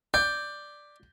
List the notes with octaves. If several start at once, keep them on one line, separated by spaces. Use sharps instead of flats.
D5 G6